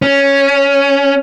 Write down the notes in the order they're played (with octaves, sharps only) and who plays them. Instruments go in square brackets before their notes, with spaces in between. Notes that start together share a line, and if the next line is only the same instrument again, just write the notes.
[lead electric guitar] C#4